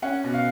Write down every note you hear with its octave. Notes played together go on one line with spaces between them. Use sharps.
C#4 F#5
B2
F5